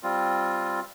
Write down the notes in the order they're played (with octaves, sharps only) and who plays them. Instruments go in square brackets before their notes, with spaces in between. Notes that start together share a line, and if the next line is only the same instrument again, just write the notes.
[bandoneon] G3 C4 F4